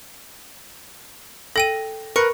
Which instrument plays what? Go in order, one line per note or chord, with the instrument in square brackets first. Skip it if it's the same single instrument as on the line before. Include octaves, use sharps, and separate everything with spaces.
[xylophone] A4 G5 D#7 [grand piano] A#6
[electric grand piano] A#4 [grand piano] B4 [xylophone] C#6 F#6 C#7